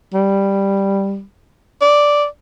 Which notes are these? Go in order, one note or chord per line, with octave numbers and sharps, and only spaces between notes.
G3
D5